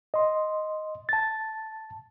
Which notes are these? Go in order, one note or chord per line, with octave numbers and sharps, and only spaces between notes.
D#5 C6
A5 A6